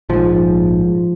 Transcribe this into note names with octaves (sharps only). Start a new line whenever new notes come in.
A#1 G#2 F3